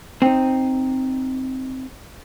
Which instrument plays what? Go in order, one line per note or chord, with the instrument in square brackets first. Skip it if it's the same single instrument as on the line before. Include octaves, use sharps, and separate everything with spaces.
[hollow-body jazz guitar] C4 D#4